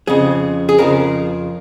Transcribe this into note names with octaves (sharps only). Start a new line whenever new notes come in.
F2 C#3 F3 G#4
G#4
F2 C#3 F3 A#4